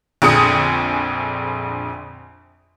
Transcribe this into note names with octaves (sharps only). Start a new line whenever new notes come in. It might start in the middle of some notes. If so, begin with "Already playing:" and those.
A#1 F2 D3 G#4 D#6 C#7